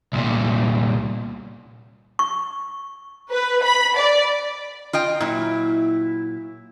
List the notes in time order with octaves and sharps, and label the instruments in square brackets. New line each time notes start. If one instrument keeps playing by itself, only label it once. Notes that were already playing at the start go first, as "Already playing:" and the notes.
[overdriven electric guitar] C2 A#2
[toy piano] C#6
[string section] B4
B5
D5
[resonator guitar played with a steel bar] F4 D#5 G5
[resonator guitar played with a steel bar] A#2 F#3 [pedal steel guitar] E4